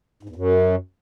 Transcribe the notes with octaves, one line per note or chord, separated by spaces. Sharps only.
G#2
E2
F#2